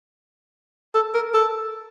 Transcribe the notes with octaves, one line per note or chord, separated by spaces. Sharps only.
A4
A#4
A4